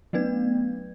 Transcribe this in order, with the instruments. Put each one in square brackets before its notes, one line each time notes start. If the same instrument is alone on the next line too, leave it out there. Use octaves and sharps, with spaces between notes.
[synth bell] F#3 A3 B3 B4 G#6